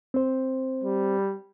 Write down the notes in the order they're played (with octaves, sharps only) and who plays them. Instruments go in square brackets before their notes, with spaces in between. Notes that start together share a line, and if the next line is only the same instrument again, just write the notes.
[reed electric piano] C4 C5
[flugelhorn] G3